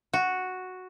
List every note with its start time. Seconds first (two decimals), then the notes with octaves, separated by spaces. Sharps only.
0.13 F#4